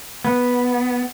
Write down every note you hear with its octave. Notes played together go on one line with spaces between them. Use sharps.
B3